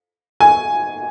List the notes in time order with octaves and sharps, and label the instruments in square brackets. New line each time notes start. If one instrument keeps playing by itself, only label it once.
[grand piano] G#5